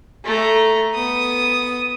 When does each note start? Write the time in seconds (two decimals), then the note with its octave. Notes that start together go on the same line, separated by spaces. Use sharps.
0.25 A3 A#5
0.94 B3 D#6